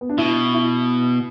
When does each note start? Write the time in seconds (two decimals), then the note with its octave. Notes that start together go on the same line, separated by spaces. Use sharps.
0.01 B3
0.09 D4
0.18 B2 E4
0.54 E4